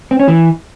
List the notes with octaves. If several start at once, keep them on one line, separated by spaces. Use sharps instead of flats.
C4
C#4
E3